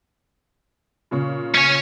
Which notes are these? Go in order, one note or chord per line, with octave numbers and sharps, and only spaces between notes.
A#2 C#3 C#6
C#4 C#5